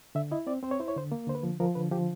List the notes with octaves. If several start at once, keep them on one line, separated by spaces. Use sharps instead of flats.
D3 E5
E4 D#5
C4 D5
C4 C5
C#5
E4 C5
C#5
D3 C5
A#3
D3 C5
B4
F3
F3 A#4
D3 B4
F3 G4